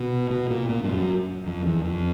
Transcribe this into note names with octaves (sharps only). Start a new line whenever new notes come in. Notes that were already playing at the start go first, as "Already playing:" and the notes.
Already playing: B2
B2
A#2
A#2
G2
F#2
F2
E2
F2